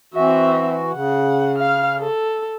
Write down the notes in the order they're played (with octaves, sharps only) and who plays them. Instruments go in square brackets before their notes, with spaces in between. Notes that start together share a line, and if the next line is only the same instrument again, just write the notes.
[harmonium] E3 F#4 [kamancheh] C4 E5
[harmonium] C#3 [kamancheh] F#5
[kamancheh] F5 F6
A4